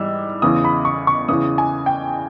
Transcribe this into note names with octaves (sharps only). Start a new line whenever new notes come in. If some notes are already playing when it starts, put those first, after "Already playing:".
Already playing: G#2 E3 G3 E6
E2 C#3 E3 D#6
B5
C#6
C#6
E2 C#3 E3 D#6
G#5
G5